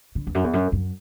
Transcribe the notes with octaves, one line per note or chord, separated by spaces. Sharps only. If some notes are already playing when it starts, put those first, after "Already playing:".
D3
E2
F#2
E2
F#2
F#2